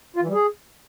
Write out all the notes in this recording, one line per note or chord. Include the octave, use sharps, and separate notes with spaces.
F4
E3
G3
G#4